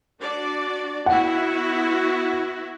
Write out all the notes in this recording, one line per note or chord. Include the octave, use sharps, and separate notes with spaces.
D4 F#4 D5
B3 E4 F#4 F#5